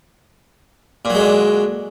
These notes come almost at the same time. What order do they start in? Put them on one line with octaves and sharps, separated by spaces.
A#2 F#3 G#3 D3